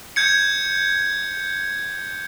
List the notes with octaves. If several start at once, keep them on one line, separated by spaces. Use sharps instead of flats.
G6 G#6 C#7